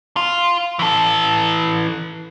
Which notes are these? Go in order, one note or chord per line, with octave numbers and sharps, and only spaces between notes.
F4
E3 A4